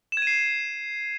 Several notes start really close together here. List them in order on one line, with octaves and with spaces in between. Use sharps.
E7 G#6 D#7 C7